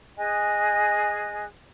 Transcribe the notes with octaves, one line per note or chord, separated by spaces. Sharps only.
G#4 D#5 G#5 F#6